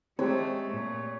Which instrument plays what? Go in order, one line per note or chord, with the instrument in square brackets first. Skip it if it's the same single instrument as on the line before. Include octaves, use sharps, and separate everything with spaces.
[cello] G#3 A3 [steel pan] C4 G4 [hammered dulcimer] C#5
[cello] A#2